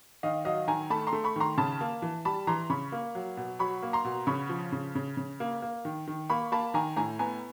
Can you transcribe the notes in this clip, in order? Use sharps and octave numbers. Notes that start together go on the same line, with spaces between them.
D#3 D#5 F5
F#3 D#5 F5
D#3 G#5 A#5
A3 A5 B5
A#5 C6
A3
B5 C#6
D#3 A#5 C6
C#3 A5 B5
A#3
E3
G3 A5 B5
E3 A#5 C6
C#3 B5 C#6
A#3
F#3
B2
F#3 B5 C#6
A#3
A#5 C6
B2
C#3 B5 C#6
F3
C#3
C#3
C#3
A#3
A#3
D#3
D#3
A#3 B5 C#6
A#3 A5 B5
D#3 G#5 A#5
A2 G#5 A#5
B3 G#5 A#5